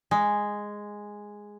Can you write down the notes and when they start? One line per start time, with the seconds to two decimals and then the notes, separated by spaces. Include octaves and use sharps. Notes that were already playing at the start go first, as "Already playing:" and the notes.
0.11 G#3